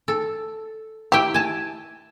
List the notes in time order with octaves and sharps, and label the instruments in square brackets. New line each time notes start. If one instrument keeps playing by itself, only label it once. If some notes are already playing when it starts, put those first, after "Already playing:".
[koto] A4
[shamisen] E4 G4 [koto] E5 G5
[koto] G#5 A5